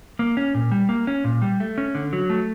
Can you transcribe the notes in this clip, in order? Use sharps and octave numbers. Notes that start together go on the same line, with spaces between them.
A#3
C#4
A#2
G3
A#3
C#4
A#2
G3
A3
C#4
D3
F#3
A3